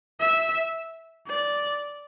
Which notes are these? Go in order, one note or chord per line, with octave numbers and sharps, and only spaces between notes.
E5
D5